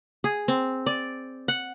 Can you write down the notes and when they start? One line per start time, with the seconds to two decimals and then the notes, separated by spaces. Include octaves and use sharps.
0.24 G#4
0.48 C4
0.86 D5
1.48 F#5